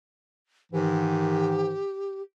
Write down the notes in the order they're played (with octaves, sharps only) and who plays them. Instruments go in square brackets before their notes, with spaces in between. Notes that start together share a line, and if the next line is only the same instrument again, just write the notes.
[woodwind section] G#2 D#3 E3 [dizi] G4